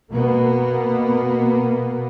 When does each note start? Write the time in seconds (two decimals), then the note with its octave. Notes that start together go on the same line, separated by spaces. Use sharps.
0.11 B2 A#3 B3